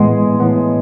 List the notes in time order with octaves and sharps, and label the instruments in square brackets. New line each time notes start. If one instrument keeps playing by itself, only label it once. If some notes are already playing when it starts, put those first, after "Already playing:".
Already playing: [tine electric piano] A2 E3 B3 [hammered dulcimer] G#3
[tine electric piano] A2 E3 B3